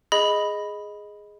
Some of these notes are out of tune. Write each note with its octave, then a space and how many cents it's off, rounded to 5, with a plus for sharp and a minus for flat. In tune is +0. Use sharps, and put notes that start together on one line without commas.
G#4 +0 D#5 +0 B5 +0